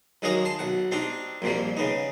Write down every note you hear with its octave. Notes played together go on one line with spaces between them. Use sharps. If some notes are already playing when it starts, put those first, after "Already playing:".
D#3 F#3 G#3 A#3 C#5 D#5
A5 C6
B1 F#5
C4 D4 D#4 G4
A#1 F2 A#2 F3 G3
C#3 B3 D#4